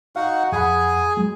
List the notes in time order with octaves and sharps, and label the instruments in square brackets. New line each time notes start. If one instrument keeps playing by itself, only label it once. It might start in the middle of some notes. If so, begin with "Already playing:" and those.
[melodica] D#4 F#4 F#5 [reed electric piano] F5
[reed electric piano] F2 F#5 B5 [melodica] G#4 G#5
[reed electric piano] F#3 G#3